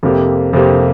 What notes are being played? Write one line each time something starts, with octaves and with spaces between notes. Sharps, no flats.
F2 C3 A#3 G4
F2 C3 A#3 G4